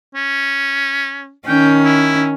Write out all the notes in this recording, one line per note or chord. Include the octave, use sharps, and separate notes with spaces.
C#4
D#3 C#4 G5
E4